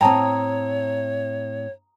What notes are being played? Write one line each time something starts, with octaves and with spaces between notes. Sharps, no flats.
A2 C4 C#5 G5 A5 A#5 D#6